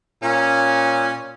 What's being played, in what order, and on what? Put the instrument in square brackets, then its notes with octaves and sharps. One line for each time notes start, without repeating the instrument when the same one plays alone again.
[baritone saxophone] A#2 [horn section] C#4